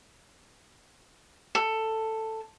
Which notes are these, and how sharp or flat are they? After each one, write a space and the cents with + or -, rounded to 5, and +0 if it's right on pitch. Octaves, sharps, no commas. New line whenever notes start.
A4 +10